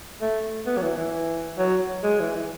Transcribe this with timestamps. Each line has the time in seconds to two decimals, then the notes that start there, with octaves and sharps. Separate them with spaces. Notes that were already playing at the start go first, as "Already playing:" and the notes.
0.21 A3
0.66 B3
0.77 F#3
0.82 E3
0.97 E3
1.58 F#3
2.04 G#3
2.20 E3
2.35 E3